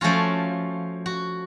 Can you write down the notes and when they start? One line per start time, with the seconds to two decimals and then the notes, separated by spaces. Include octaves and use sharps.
0.01 F3 A3 C#4 F4 F#4
1.06 F#4